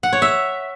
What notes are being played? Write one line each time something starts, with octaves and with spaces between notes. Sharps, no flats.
F#5
C#5
E5